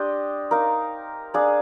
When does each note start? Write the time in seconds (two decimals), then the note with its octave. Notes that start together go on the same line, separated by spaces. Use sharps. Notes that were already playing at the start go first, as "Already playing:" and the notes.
Already playing: D4 G4 C5 D#5
0.51 D#4 A#4 F5
1.34 D4 G#4 D5 F5